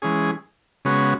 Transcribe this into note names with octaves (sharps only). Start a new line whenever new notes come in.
E3 G#3 C#4 G#4
C#3 G#3 B3 F#4 C#5